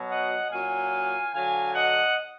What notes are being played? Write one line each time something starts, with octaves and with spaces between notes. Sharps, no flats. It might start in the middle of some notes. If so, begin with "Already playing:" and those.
Already playing: B2 F#3
D#5 F#5
A#2 F#3 F5 G#5
D3 F#3 F5 G#5
D#5 F#5